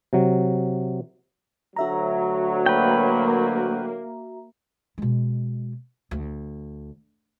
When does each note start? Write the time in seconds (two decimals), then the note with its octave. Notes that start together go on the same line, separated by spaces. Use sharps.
0.13 C3 F#3
1.76 D2 F#3 F#4 E5 A#5
2.66 A#3 B4 G5
4.98 B2 G#3
6.11 D2